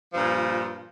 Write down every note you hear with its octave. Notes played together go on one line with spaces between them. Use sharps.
G2 A#2 F3